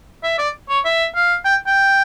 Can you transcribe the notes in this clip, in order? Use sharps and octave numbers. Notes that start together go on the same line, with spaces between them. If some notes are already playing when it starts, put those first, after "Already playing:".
E5
D5
C#5
E5
F5
G5
G5